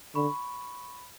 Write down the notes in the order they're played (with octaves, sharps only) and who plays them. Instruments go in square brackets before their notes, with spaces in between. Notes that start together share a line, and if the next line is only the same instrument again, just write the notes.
[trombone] D3 [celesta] B5 C#6